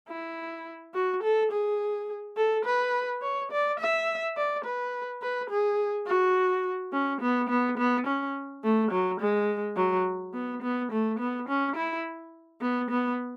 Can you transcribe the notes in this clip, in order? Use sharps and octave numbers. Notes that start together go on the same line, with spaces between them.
E4
F#4
A4
G#4
A4
B4
C#5
D5
E5
D5
B4
B4
G#4
F#4
C#4
B3
B3
B3
C#4
A3
F#3
G#3
F#3
B3
B3
A3
B3
C#4
E4
B3
B3